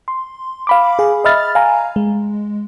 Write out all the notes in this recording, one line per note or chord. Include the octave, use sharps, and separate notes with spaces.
C6
F5 B5 D6
G#4 F5
D#5 E5 B5 F6 A6
F5 G#5 A#5
G#3